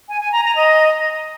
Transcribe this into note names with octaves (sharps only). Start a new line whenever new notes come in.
G#5
G#5
A#5
A#5
D#5